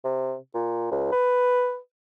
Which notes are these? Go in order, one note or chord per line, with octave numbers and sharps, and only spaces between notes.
C3
A#2
C#2
B4